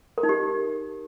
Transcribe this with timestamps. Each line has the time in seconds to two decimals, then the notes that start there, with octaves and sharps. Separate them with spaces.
0.18 A#4
0.23 D#4
0.29 G4